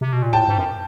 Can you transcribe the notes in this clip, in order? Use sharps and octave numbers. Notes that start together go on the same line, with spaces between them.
C3
B2
A#2
A2 G5 A5
G#2
F#2